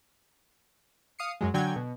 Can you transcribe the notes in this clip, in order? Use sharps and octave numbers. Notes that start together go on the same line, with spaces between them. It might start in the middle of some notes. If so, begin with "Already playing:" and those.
F5 D#6 C7 C#7
F#2 F#3 G#3
D3 F#3 G5 G#5 G#6
B2